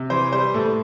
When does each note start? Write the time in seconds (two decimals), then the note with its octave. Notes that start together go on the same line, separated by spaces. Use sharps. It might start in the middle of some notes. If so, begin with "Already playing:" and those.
Already playing: C3
0.10 E3 C5
0.33 G3 C5
0.54 A2 A4